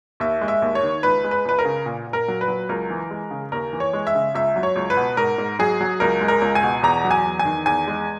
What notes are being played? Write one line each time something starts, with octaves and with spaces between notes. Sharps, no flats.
D#2 E5
G#3
E5
D#2
C#5
D#3
C#2 B4
G#3
B4
C#2 B4
A#4
C#3
A#2
A#2
A#4
F#3
B4
F#3
C#2 A#4
E3
G#3
C#3
D#2 A#4
E3
C#5
G#3
E5
C#3
C#2 E5
F#3
C#5
C#2
B4
B2
G#2 A#4
G#2
F#3 G#4
F#3
C#2 A#4
G#3
A#4
C#2
G#5
B2
E2 A#5
F#3
G#5
E2
G#5
D#3
E2 G#5
G#3